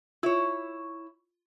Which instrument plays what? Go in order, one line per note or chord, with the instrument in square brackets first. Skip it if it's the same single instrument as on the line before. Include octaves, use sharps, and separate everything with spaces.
[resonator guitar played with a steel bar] E4 C#5 [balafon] F4